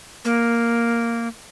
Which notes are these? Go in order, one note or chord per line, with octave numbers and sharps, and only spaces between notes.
A#3